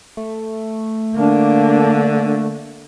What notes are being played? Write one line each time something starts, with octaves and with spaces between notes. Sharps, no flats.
A3
D3 A#3 D4